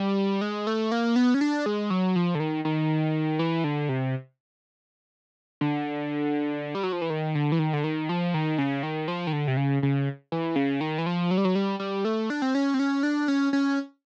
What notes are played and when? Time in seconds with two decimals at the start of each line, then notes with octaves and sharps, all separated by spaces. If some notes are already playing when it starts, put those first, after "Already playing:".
Already playing: G3
0.41 G#3
0.67 A3
0.92 A#3
1.16 B3
1.34 C#4
1.41 D4
1.66 G#3
1.90 F#3
2.16 F3
2.35 D3
2.40 D#3
2.65 D#3
3.39 E3
3.64 D3
3.89 C3
5.61 D3
6.75 G3
6.83 F#3
6.93 F3
7.02 E3
7.10 D#3
7.35 D3
7.52 E3
7.59 D#3
7.73 D3
7.84 D#3
8.09 F3
8.34 D#3
8.58 C#3
8.83 D#3
9.08 F3
9.27 D#3
9.33 D3
9.48 C3
9.57 C#3
9.83 C#3
10.32 E3
10.56 C#3
10.81 D#3
10.98 E3
11.06 F3
11.31 F#3
11.38 G3
11.45 F#3
11.55 G3
11.80 G3
12.05 A3
12.30 D4
12.42 C4
12.55 C#4
12.74 C4
12.79 C#4
13.03 D4
13.28 C#4
13.53 C#4